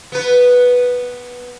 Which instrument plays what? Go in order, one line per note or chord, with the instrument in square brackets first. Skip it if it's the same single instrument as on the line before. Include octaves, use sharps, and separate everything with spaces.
[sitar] B3 B4